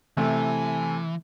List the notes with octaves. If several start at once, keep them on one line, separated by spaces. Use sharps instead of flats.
C3 E3 A3 G#5